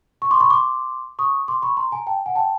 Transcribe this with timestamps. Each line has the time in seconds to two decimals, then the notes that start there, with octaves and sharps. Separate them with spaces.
0.22 C#6
0.31 C6 D6
0.40 B5 C#6
0.50 C6 D6
1.19 C#6 D#6
1.48 C6 D6
1.62 B5 C#6
1.77 A#5 C6
1.92 G#5 A#5
2.07 G5 A5
2.26 F#5 G#5
2.35 G5 A5